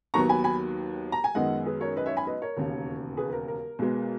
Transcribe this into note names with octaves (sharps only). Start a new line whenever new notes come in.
D#2 D#3 F#3 B3 A#5 C#6
G#5 B5
G#5 B5
A#5
G#5
F#2 D#3 G#3 B3 D#5 F#5
G#4 B4
A#4 C#5
B4 D#5
C#5 E5
G#5 B5
B4 D#5
A#4 C#5
E1 D#2 C#3
G#4 B4
B4
A#4
A#4
B1 B2 G#3 B3